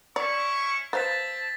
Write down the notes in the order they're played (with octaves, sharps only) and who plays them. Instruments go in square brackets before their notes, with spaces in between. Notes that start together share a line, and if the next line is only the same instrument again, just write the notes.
[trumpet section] C#4 E4 C#6 [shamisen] D5
[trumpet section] C4 A5 [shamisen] B4 C5 F5 [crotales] A6 B6